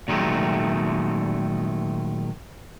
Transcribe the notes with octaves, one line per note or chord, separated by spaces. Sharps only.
A#2 D#3 F#3 G#3 A3